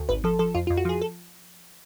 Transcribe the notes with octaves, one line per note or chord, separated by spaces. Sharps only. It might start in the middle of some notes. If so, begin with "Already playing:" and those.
Already playing: D2
G#1 B4
F3 A4
F3 A4
F2 F4
F4
F2
F#4
F3 G#4
A4